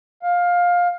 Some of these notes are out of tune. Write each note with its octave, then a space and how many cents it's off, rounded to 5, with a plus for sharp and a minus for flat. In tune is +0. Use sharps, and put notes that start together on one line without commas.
F5 +15